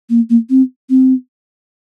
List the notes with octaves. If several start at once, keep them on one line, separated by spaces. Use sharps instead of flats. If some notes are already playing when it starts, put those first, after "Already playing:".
A#3
A#3
C4
C4